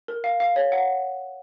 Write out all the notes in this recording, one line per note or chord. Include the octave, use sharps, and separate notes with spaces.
A#4
F5
F5
C#5
F#5